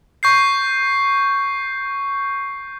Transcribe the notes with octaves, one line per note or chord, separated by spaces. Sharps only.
C#6 G6 C7